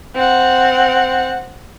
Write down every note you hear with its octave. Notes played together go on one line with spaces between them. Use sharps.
C4 F#5